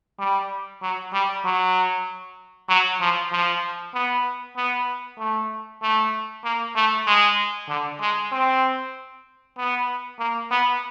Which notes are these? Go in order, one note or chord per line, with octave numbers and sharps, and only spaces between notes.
G3
F#3
G3
F#3
F#3
F3
F3
B3
B3
A3
A3
A#3
A3
G#3
D3
G#3
C4
B3
A#3
B3